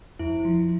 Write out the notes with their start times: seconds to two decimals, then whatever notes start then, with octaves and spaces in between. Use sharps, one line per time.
0.19 F2 E4
0.45 F3